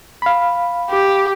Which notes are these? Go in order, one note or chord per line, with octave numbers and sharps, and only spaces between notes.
F5 B5
G4